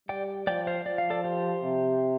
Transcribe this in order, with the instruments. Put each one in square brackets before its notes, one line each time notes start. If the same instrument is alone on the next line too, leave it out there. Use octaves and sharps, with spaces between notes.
[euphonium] G3 [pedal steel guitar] D5 G5
[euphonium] F3 [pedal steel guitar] D5 G5
[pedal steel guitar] C5 F5
[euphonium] F3 [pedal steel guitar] D5
[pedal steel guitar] F5
A4 D5
G4 C5
[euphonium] C3